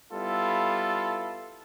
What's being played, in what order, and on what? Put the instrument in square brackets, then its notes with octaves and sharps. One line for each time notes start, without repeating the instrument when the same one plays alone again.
[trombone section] G3 B3 E4 F4 A4